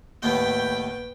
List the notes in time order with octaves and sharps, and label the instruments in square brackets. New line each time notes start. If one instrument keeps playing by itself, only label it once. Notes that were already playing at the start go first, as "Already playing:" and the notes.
[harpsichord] D#2 A2 B3 [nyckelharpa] B4 G5